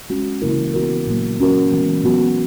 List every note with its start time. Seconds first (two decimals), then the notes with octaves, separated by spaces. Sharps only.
0.10 G#3 C#4 F#4
0.42 C#3 E3 A#3 E4 A#4
0.74 E3 B3 F#4 A#4
1.07 A#2 F#3 A#3
1.39 F#3 C#4 F#4 A#4
1.72 E3 G#3 B3
2.03 F#3 B3 F#4